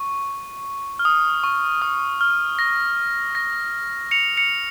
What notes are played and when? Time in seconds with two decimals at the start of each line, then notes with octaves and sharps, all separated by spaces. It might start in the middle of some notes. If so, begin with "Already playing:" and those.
Already playing: C#6
0.99 F6
1.05 D#6
1.44 C#6
1.82 D#6
2.21 F6
2.59 A#6
3.35 A#6
4.11 C#7 F7
4.37 C#7 F7